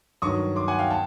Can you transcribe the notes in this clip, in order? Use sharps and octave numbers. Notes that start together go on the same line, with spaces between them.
G2 D#3 F#3 C#6 D#6
C6 D6
F#5 G#5
F5 G5
G5 A5